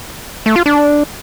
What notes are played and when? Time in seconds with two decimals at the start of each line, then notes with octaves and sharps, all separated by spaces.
0.46 A3
0.56 F4
0.66 D4